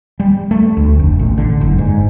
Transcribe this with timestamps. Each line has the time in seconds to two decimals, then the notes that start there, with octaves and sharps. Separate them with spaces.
0.20 G3
0.51 A3
0.77 D2
0.99 F1
1.19 A1
1.38 D3
1.61 F#1
1.79 G#2